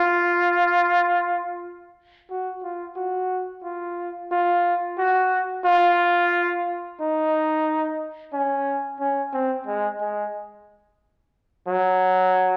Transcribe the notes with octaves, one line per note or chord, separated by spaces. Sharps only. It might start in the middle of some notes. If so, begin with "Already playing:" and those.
Already playing: F4
F#4
F4
F#4
F4
F4
F#4
F4
D#4
C#4
C#4
C4
G#3
G#3
F#3